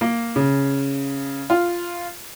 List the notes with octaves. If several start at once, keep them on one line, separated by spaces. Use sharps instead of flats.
A#3
C#3
F4